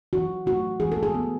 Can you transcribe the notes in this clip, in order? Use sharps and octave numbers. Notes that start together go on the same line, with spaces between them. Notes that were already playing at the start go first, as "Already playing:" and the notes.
E3 F#4
A3 F#4
E3 G#4
A4
G#4
B3